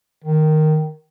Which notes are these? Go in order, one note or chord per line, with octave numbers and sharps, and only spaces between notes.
D#3